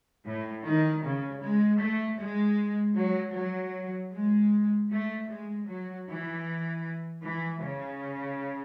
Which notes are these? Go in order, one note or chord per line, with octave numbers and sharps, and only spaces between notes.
A2
D#3
C#3
G#3
A3
G#3
F#3
F#3
G#3
A3
G#3
F#3
E3
E3
C#3